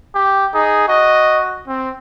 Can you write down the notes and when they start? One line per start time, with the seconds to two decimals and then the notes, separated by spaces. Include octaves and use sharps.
0.15 G4
0.54 D#4 G#4
0.88 F#4 D#5
1.67 C4